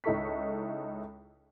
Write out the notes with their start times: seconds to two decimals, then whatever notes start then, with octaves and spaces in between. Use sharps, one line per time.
0.04 C#2 D#4 E4 A4 C#6 B6